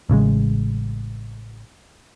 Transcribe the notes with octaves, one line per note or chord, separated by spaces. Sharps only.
A1 C#3 E3 G#3